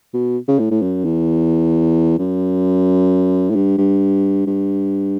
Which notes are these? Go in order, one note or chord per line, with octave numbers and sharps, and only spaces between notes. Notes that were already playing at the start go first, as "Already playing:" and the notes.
B2
C#3
A2
A2
F#2
E2
F#2
A2
G2
G2
G2